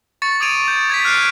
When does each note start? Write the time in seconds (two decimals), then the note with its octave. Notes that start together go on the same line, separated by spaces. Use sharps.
0.22 C#6 A6 C#7
0.40 D6 D#6 G#6 D7 D#7 F7
0.68 G6
0.90 G#6 A6 B6
1.05 F6 F#6 C7 D7